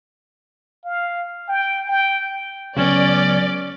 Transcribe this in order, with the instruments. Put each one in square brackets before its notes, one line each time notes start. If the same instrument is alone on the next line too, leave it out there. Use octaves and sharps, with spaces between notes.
[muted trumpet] F5
G5
G5
[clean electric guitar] C#2 F#3 B3 [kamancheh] C#4 [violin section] D5